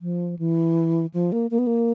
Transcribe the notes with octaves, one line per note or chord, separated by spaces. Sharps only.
F3
E3
F3
A#3
A#3
B3
A#3